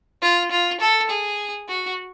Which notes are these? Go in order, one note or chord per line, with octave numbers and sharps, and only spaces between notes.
F4
F4
A4
G#4
F#4